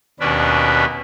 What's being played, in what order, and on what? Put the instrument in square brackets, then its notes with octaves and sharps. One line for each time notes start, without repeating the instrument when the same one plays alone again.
[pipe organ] D#2 B2 C#4 D4 B4